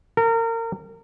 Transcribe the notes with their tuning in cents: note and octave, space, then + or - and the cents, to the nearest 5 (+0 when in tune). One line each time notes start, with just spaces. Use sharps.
A#4 -30